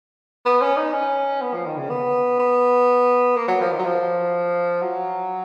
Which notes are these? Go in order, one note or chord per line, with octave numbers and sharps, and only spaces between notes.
B3
C#4
D#4
C#4
B3
F3
D#3
C#3
B3
B3
A#3
F#3
F3
D#3
F#3
F3
F#3